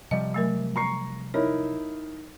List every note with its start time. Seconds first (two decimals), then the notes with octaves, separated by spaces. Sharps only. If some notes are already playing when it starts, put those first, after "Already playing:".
0.11 C3 F3 G3 D#5
0.34 F#3 A3 A#4
0.76 A#5 C#6 C7
1.34 D#4 E4 A#4 C#5